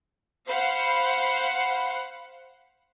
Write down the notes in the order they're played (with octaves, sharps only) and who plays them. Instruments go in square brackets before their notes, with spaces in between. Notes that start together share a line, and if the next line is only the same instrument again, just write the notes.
[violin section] C5 F5 F#5 B5